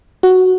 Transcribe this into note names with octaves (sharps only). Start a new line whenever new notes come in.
F#4